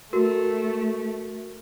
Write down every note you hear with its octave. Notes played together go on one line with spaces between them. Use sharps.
A3 F#4 A#4